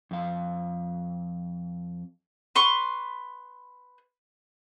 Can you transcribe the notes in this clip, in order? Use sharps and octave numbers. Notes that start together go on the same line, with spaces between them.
F2 F5
B4 C6 C#6